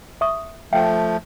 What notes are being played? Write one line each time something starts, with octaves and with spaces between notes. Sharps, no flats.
E5 C#6 D#6
F3 A3 E5 F5 G5